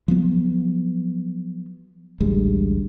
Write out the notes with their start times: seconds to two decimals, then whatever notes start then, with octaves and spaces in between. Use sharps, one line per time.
0.08 F3 F#3 B3
2.20 A1 D2 G3 G#3